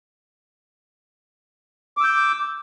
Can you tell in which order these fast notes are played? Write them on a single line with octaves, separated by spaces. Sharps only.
D6 E6 G6